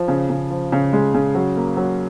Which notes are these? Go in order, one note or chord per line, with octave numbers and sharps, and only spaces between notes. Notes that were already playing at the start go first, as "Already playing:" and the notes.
Already playing: F3
C#3
C#3
F3
C#3
G#3
C#3
F#3
A#3
F#3